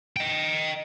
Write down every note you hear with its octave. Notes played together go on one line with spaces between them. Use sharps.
D#5 G5